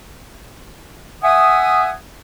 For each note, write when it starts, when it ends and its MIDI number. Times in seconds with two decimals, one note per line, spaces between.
1.23 1.91 76
1.23 1.91 78
1.23 1.91 80
1.23 1.91 87